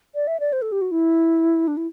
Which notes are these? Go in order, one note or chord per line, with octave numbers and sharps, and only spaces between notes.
D5
E5
D5
C5
A4
G4
F#4
E4
D4
E4